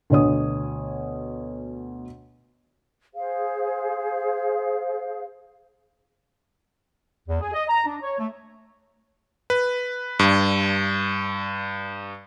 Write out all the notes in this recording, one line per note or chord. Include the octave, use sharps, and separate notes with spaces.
D2 B2 C#5 D#6
G#4 C5 F5
E2
G#4
D#5
A#5
D4
C#5
A3
B4
G2